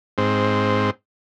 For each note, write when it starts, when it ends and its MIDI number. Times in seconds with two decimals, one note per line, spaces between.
0.18 0.90 44
0.18 0.90 60